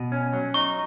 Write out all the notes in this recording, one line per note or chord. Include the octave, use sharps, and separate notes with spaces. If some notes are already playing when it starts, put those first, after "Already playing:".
Already playing: B2
C#4
F#3
D#4 C#6